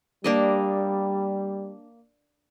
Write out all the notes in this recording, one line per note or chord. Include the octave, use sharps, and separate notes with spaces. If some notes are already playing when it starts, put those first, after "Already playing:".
G3 A#3 D4 D#5